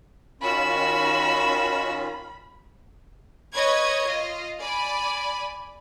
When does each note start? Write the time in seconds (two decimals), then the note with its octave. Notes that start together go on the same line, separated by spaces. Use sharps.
0.41 D#3 C#4 F4 F#4 B5 E6
3.54 B4 C#5 D#5 G#6
4.06 F4 D#5
4.61 D5 G#5 B5